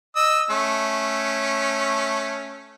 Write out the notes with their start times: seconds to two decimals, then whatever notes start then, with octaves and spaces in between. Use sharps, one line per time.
0.16 D#5 E6
0.50 A3 C#4